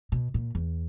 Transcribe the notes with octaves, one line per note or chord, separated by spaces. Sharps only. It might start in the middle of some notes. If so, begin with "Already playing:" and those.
B2
A#2
E2